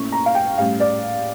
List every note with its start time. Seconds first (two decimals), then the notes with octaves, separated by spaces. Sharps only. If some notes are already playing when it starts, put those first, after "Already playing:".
Already playing: A#2 A3 C#4 E4 C#6
0.12 A#5
0.26 F5
0.35 G5
0.58 A2 G3 C#4 F5
0.80 D5